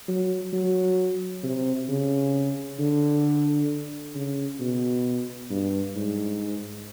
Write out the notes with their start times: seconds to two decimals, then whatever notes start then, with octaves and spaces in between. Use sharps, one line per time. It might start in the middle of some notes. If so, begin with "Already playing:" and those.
0.08 F#3
0.53 F#3
1.44 C3
1.89 C#3
2.79 D3
4.15 C#3
4.60 B2
5.50 G2
5.96 G#2